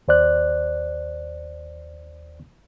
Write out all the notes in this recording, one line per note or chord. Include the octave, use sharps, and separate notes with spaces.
D#2 C5 D5 F#6